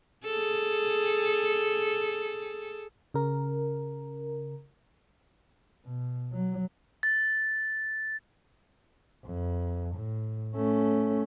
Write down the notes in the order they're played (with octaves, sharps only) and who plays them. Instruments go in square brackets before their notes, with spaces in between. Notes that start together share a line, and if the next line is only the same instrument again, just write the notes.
[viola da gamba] G#4 A4
[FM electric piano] C#3 A#4
[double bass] B2
F#3
[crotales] A6
[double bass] F2
A2
A3 C#4